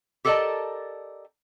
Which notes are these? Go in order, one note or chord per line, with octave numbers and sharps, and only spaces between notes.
G4 A4 A#4 D5 D#5 A5